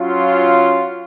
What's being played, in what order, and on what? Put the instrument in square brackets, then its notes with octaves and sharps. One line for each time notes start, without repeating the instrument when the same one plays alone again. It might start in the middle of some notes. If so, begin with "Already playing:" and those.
Already playing: [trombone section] F#3 C#4 F4